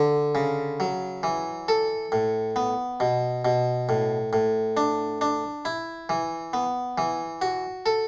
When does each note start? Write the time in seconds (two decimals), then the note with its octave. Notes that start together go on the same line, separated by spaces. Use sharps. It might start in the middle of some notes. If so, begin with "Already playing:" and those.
Already playing: D3
0.35 C#3
0.80 F#3
1.23 E3
1.68 A4
2.12 A2
2.56 B3
3.00 B2
3.45 B2
3.89 A2
4.33 A2
4.77 D4
5.21 D4
5.65 E4
6.09 E3
6.53 B3
6.98 E3
7.42 F#4
7.86 A4